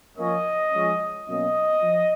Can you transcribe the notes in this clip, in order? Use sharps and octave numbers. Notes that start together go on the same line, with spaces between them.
F3 A#3 C#4 D#5
F3 G#3 C#4
B2 F#3 A#3 C#4 D#5
F3